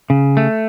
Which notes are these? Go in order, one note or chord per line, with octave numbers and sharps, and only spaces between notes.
C#3
A3